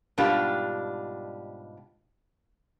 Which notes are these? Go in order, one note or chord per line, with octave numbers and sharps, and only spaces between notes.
G#2 B2 G3 D4 F4 G4